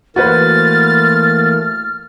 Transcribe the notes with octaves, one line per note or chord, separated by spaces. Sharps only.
E3 A3 A#3 F#4 B4 C5 F6 A6